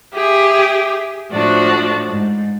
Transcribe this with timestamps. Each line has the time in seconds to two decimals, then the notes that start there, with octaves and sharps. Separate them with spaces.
0.13 G4 G#4 E5
1.31 A2 F3 D4 F#4
2.09 G#2